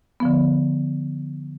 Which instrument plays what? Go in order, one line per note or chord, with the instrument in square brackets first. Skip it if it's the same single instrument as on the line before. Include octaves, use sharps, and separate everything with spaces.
[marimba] D3 F3 B3